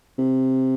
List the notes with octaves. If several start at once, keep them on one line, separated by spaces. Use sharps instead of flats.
C3